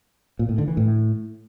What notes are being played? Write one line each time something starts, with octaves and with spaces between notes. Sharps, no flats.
A#2
A2
D3
E3
A2